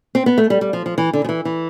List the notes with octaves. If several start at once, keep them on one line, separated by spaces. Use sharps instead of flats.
C4
B3
A3
G3
G3
F3
F3
E3
D3
F3
E3
E3